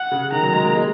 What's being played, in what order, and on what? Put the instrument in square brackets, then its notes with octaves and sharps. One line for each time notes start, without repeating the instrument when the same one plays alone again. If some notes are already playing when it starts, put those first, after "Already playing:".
Already playing: [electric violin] F#5
[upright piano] C#3
[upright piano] D#3 [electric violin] A#5
[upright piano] F#3
G#3
A#3
G#3